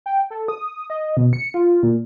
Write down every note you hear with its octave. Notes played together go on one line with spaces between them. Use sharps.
G5
A4
D#6
D#5
B2
C#7
F4
A#2